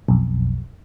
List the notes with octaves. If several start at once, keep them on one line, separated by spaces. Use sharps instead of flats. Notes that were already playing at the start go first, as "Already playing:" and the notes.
B1 F2